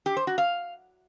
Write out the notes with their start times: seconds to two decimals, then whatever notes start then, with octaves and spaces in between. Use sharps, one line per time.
0.06 G4
0.17 C5
0.27 F#4
0.38 F5